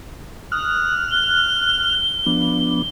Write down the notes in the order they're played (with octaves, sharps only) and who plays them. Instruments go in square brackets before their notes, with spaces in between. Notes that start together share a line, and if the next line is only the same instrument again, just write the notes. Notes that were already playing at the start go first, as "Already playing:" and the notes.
[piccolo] D#6 [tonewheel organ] F6 F#6
[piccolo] G7
[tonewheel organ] F3 B3 D4